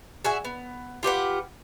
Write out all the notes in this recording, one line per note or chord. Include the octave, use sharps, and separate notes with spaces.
F#4 G#4 E5
B3
F4 G4 B4 F#5